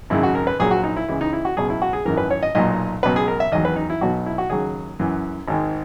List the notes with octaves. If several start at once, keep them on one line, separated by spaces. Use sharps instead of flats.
G#1 F#2 C#3 E4
F#4
A#4
B4
A#1 A#2 F#3 G#4
F#4
D#4
E4
C#2 C#3 E3 E4
D#4
E4
F#4
C#2 B2 F#3 G#4
E4
F#4
G#4
G#1 F#2 E3 A#4
B4
C#5
D#5
B1 A#2 F#3 D#5
C#2 B2 F#3 B4
G#4
A#4
E5
E2 D#3 F#3 D#5
B4
D#4
E4
B1 B2 F#3 F#4
E4
F#4
D#2 C#3 F#3 G#4
F#2 E3
G#1 G#2 D#3